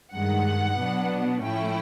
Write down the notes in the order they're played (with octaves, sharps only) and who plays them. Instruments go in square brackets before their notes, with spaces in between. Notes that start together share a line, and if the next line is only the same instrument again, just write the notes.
[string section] G2 D#3 G#3 F#5
B2 F#3 B3 D4
A2 F3 A3 C#4 E4 G5